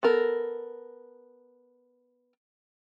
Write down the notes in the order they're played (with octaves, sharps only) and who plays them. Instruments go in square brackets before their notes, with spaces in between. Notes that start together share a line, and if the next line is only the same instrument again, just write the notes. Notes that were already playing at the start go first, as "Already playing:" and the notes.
[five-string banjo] B3 A4 A#4